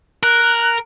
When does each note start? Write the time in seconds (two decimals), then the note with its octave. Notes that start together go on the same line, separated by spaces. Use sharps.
0.23 A#4 F#6